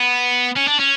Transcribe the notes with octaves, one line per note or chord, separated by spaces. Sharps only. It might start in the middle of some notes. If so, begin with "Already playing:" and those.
Already playing: B3
C#4
D4
C#4